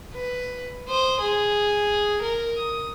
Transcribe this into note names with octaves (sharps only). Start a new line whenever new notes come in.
B4
C5 D#6
G#4
A#4
D#6